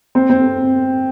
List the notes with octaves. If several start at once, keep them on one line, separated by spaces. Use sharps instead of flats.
C4
C4